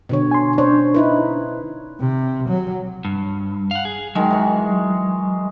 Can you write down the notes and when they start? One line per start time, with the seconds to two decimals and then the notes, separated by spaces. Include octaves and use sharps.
0.09 B2 D3 C#5
0.31 G#5 C6
0.58 C#4 D4 C5 C#5
0.94 D#4 E4 B4
2.00 C3
2.49 F#3
3.05 G2
3.71 F5 F#5
3.85 G#4
4.15 D#3 F#3 G#3
4.31 E3 C#6